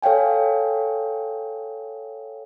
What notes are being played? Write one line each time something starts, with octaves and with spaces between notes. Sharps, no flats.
A4 C#5 F5 G5 G#5